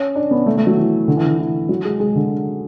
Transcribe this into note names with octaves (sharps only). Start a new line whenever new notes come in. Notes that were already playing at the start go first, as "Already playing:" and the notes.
Already playing: C#4
D4
B3
A3
A3
F#3
E3
D3
E3
D3
E3
F#3
G#3
G#3
D3